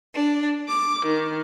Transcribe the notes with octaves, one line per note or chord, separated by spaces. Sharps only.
D4
D6
D#3